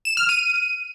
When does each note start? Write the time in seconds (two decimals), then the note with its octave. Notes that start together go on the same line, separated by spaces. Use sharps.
0.05 E7
0.17 F6
0.29 D#7